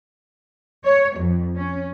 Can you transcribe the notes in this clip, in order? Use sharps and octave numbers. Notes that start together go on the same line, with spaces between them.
C#5
F2
C#4